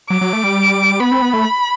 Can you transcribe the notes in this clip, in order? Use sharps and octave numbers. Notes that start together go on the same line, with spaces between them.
F#3 D6
F#3
A3
G3
B3 B5
C4
B3
A3